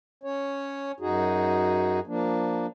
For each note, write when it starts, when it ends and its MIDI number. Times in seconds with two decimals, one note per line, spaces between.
0.24 0.92 61
0.24 0.92 73
1.00 2.00 42
1.00 2.00 63
1.00 2.00 66
1.00 2.00 68
2.07 2.67 53
2.07 2.67 58
2.07 2.67 62